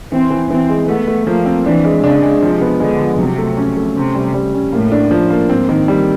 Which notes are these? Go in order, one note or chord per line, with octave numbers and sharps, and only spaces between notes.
E3 C4
E3
E3 C4
G#3
A3 B3
A3
F3 A#3
C4
E3 D4
G#3
C#3 D4
G#3
C3 F3
B3
D3 G#3
F3
C3 F#3
A3
C#4
A3
C3 C#4
G3
G3
C#4
A2 A#3
D4
F3
A#3
G#2 C4
D#3
G3